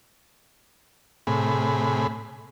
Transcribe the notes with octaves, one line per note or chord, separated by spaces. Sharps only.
A2 C3 G#4 B5